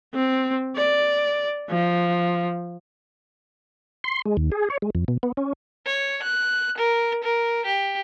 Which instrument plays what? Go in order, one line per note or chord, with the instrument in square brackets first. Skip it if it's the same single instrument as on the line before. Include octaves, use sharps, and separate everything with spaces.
[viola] C4
D5
F3
[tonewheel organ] C6
G#3
D#2
G#4
C#5
G#3
F2
B2
B3
C#4
[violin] C#5
F#6
A#4
A#4
G4